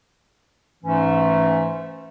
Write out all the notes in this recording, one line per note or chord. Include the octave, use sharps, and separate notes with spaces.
G#2 E3 A3 C#4